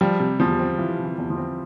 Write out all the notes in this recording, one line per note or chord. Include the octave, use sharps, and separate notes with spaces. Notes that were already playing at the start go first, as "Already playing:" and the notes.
F3 G3
C3
E2 F3
C4
E3 F3
C3
E3
E2
F3
C4